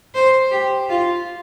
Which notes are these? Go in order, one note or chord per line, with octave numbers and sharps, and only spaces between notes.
C5
G4
F4